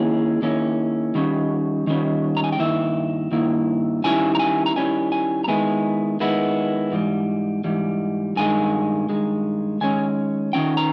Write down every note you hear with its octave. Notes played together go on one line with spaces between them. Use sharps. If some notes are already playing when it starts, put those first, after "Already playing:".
Already playing: D#3 A#3 C#4 E4 G#4
D#3 A#3 C#4 E4
D#3 G3 C#4
D#3 G3 C#4
A#5
G#5
G5
G2 D#3 A#3 E4 E5
G2 D#3 A#3 E4
D#3 G3 C#4 E4 G#5
A#5
G#5
A#5
D#3 G3 C#4 E4 G#5
G#5
A#5
D#3 G#3 B3 E4 G#5
D#3 G#3 B3 E4
G#2 E3 G3
G#2 E3 G3
G2 D#3 G#3 G#5
G2 D#3 G#3
D#3 G#3 C#4 G#5
D#3 G#3 C#4 G5
A#5